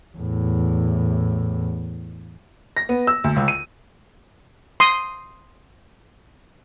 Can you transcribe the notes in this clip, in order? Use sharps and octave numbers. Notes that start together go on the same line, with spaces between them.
E2 A2
A#6
B3
E6
D2
C#2
D#7
C6 D#6